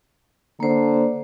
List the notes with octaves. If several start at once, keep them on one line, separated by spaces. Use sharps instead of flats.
D3 A#3 C5